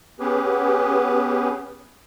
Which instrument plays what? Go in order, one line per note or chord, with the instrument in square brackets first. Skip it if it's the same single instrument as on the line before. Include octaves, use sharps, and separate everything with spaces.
[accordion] B3 C#4 G4 G#4 B4